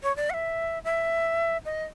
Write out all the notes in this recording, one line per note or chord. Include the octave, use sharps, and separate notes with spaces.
C#5
D5
F#5
E5
E5
D#5